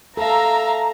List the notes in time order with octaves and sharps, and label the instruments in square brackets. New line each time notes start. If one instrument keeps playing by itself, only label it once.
[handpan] A4 [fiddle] E5 F5 [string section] A#5